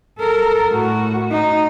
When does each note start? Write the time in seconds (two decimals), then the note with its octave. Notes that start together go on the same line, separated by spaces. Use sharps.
0.19 A4 A#4
0.71 A2 F#4
1.32 D#4